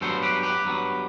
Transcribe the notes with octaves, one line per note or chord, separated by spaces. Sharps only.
G2 F#3 B3 A4 C5
G4 B4
G4 B4
G2 F#3 B3